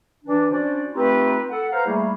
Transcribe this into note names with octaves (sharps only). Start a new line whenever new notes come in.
E3 D4
C#4 D4 F#4 C5 D5
A3 C4 D#4 F4 G4 B4
A4 F#5
B4 C5 F5 A#5
G3 A3 A#3 E4 G#4